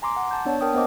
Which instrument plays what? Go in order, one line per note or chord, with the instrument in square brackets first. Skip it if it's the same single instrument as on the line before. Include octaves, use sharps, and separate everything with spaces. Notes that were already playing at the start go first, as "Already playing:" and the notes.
[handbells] G#5 A#5 C6 D6
F#5
A5 G6
B3 D4 C#5 D5 A5
A#4 G5 D#6
A#3 B3 A#4 C5 D#5 D6